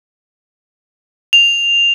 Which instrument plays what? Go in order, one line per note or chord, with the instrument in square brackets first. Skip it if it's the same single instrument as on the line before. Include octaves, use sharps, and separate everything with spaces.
[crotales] F7